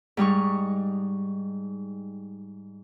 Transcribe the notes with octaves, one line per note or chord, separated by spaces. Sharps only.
G#2 G3 D#4 C#6